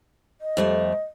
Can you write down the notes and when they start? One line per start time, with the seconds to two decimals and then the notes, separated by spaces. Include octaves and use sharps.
0.41 D#5
0.57 F2 G3 A3